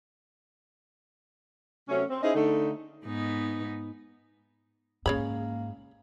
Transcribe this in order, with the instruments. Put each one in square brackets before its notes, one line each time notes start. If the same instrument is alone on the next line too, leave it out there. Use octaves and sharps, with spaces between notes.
[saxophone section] C3 F#3 A3 C#4
C4
C#4 D#4 E4 G#4 C5 D#5
D3 A3 D#4
[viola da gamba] G#2 B3 D#4
[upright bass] G#2 [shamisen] C#3 C#5 B5 [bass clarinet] A#3